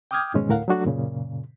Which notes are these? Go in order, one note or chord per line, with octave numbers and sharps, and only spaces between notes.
G5 D6 D#6 F6 G6 G#6
F2 G#2 B2 D#3 G#3 C#4
D2 A2 A#4 F5 F#5
F#3 A3 D4 F#4 A4
F#2 A#2 C#3